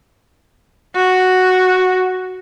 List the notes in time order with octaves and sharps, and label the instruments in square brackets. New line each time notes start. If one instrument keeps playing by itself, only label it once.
[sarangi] F#4